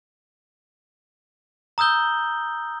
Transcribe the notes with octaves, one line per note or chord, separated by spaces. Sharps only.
A#5 D#6 E6 G6 G7